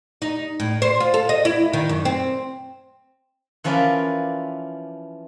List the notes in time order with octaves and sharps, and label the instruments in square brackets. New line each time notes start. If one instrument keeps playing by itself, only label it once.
[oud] D#4
A2
C5
F4
A4
D#5
E4
D#3
F#2
C4
[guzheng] E3 F3 C#4 A#4 B4 D5